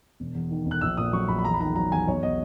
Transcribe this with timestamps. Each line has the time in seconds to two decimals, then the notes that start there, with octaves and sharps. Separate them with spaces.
0.20 E1
0.35 E2
0.51 D#3
0.66 E1
0.71 F#6
0.81 A#1 E6
0.97 A#2 D#6
1.13 F#3 C#6
1.28 A#1 B5
1.38 B5
1.45 E2 A#5
1.54 B5
1.60 D#3 A#5
1.76 F#3 A#5
1.91 E2 G#5
2.08 B1 C#5
2.22 B2 D#5